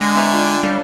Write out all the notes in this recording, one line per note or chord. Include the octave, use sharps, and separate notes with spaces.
D3 G#3 G#5 A#6
C4 E4 B4 C5 A#5 C#6
D4 F4 G5
G3 C#4 D4 F4 A4